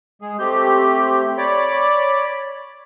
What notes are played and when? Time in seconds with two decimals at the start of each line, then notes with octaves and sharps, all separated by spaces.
0.22 G#3 G#4
0.39 A3 C4 G4 G6
1.38 C#5 D5 B5 D6